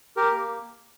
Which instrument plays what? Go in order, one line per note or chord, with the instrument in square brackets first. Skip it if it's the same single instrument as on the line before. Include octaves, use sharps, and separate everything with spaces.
[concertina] G4 A#4
A#3